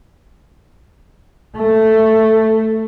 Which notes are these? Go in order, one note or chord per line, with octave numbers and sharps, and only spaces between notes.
A3